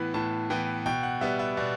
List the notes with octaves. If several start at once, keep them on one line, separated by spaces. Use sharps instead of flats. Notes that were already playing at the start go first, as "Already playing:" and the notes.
Already playing: A2 E3 B3 B5
A2 A5
E3 B3 G5
B2 G5
F#5
G3 B3 E5
E5
B2 D5